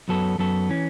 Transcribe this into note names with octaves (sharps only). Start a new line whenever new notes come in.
F#2 F#3 B3 A4
F#2 F#3 B3 A4
E3 C#4